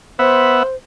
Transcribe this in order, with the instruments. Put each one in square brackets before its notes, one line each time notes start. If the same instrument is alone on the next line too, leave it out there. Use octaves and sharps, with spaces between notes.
[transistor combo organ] B3 E5 F#5 [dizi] C5